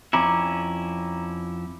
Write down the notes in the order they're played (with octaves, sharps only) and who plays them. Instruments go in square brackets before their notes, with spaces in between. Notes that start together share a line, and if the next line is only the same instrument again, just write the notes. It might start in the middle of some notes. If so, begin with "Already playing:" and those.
[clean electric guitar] F2 C#4 E4 [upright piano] A#5 D6